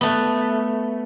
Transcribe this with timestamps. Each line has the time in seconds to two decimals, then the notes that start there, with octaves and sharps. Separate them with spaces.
0.01 A3 B3